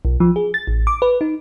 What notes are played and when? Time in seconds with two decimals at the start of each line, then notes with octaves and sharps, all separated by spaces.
0.05 B1
0.20 F3
0.36 G#4
0.54 A6
0.67 A1
0.87 D6
1.02 B4
1.21 D#4